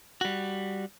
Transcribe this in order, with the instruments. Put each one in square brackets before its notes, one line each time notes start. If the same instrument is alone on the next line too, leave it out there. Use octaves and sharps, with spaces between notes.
[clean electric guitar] G3 F#4